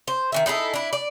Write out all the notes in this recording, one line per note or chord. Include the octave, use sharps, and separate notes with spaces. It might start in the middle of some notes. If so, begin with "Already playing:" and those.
C5
D#3 E3 E5
D#4 E4 G#4 A4
D4 E4
D5